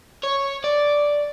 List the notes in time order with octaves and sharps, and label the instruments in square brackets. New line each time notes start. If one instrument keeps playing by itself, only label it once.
[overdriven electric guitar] C#5
D5